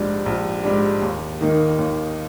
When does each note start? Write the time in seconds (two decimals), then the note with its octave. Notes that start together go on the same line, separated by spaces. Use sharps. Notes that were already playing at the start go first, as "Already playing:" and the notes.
Already playing: A#1 G#2 G3 D4
0.26 A#1
0.63 G#2 G3 D4
1.02 D#2
1.41 D#3 A#3 D#4
1.79 D#2